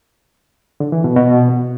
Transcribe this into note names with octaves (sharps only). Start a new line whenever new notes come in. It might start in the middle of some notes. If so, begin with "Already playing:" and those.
D3
E3
B2
B2